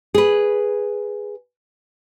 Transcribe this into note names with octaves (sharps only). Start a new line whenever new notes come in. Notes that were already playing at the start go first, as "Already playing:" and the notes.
G#4 B4